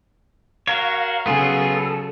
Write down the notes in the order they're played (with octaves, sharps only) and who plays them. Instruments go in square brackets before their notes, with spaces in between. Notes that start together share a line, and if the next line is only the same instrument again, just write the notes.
[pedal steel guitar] F#4 A#4 C#5 [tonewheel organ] F5
[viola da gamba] C#3 F#3 [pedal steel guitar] B3 F4 G#4 [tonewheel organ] A4